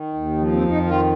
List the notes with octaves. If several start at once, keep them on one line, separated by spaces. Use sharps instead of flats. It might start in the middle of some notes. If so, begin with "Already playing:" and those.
Already playing: D#3
D#2
F3
C4
F2
D#4
D#3 F4